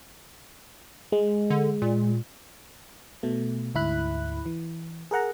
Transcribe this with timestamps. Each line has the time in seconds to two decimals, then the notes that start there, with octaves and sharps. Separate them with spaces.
1.12 G#3
1.50 D3
1.82 A#2
3.23 B2 A3
3.75 D2 G#2 E4 B5 F#6
4.46 E3
5.11 G#4 A#4 F#5 A#5